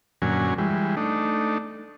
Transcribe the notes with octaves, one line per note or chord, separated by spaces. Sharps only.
F#2 A#2 D3 F#3 C#4 G#5
E3 G3 G#3
A3 D4 D#4